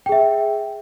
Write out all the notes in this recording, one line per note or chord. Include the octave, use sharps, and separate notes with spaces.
G#4 E5 G5